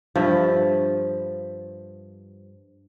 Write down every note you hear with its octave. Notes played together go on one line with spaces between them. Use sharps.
G2 F3 E5